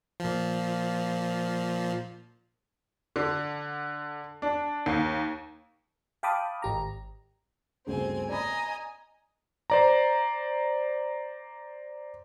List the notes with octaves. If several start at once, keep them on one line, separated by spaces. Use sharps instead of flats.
A#2 F3
D3
D4
D#2
F5 G5 A5 B5 D6 D#6
G#1 G4 A#5
G1 D2 C#3 C4 G#5
D5 D#5 G#5 A#5 B5
C5 D5 A#5